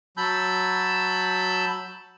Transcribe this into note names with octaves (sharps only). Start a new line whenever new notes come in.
F#3 A5 B5 E6 G6